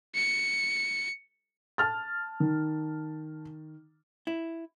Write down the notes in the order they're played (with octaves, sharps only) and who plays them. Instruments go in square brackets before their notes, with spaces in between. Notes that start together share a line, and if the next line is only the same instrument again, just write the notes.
[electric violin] C#7
[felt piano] A5 F6 A6
[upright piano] D#3
[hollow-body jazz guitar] E4